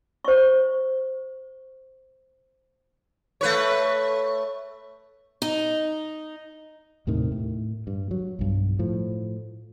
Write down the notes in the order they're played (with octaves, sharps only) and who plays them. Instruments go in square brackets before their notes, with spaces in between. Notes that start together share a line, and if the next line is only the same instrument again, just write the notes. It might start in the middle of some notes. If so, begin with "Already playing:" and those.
[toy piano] C5 C#6
[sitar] A3 B4 C#5
[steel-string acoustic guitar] D#4
[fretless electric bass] D#2 A2 C3 D#3
A2
G2
F#3
B1 G2
A2 F3